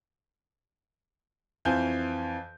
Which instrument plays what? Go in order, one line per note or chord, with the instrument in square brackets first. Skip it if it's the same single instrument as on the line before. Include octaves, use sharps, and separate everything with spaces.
[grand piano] F2 E3 C5 F5 G#5 G6